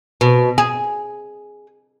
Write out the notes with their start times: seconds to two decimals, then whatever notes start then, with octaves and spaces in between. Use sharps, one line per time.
0.21 B2
0.58 G#4